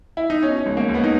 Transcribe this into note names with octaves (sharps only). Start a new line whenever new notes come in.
E4
D#4
B2 C#4
C#2
A#3
C#2
B3
D#4